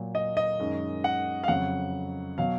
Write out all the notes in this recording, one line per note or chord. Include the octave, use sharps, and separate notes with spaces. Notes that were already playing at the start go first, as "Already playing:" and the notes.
Already playing: A#2 F#3
D#5
D#5
F#2 D#3 G#3
F#5
F5
F2 C#3 F#3 F#5
B2 F#3 F5